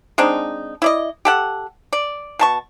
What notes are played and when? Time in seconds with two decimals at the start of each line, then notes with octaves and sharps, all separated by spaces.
0.18 G#3 C4 D4 D#4
0.82 E4 D5 D#5
1.25 G4 A4 F#5
1.93 D5
2.39 B2 A5 C#6